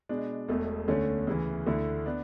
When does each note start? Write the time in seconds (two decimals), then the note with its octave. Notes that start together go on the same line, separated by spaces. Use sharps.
0.09 B2 G#3 D4
0.48 E1 E2 B2 A3
0.88 D2 D3 A3 C#4
1.27 D2 C#3 E3
1.66 D2 D3 A3 E4
2.06 B3 D4